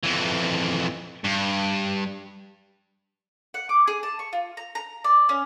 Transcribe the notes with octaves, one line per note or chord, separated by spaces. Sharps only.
F2 E3
G2
F#5
D6
G#4
A5
C#6
F4
A#5
A#5
D5
C#4